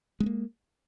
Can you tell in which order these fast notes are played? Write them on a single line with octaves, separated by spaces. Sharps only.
G#3 B3 A#3